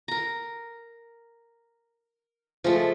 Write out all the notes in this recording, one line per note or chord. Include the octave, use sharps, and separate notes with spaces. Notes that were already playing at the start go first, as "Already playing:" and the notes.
A#4 A#5
F3 G#3 A3